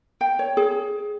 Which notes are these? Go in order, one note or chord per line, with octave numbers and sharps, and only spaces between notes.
G5
C#5
G#4